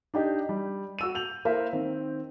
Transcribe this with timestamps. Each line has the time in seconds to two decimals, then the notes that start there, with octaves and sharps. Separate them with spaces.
0.14 D4 D#4 G4 D#5
0.49 G3
0.99 F#4 E6 D#7
1.15 G6 F7 F#7
1.45 A#3 E4 A#4 C5 E5 F5
1.73 D#3 C4